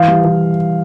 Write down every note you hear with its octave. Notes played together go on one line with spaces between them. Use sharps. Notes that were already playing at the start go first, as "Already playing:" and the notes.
Already playing: E3 F5
G3
E3